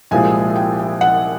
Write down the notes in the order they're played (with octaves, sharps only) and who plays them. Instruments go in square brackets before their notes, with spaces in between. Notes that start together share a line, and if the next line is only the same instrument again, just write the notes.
[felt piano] C2 A#2 F3 G#3 G#5
G5
F#5